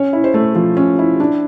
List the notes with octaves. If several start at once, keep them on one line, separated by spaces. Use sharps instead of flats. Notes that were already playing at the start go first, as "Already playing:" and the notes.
Already playing: C#4 C#5
E4
C5
A3
F3
C#4
E4
D4